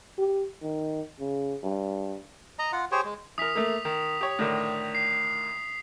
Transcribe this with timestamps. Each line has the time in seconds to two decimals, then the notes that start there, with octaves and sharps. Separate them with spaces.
0.18 G4
0.63 D#3
1.20 C#3
1.63 G2
2.59 D#5 A#5
2.72 F4 F#5
2.91 G4 G#4 C5 C#5
3.05 G#3
3.38 E3 A#4 D#6 B6 F7
3.55 A3 A#3
3.85 D#3
4.21 G4 C#5
4.39 A2 D3 D#3
4.95 C7